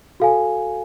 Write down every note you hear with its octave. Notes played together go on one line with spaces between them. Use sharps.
F#4 A4 F5 G#5